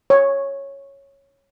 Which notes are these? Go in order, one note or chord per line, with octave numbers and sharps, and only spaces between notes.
C#5